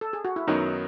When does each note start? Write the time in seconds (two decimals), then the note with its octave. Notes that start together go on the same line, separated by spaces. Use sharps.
0.01 A4
0.13 G#4
0.25 F#4
0.36 E4
0.47 F#2 D#3 F#3 B3 D#4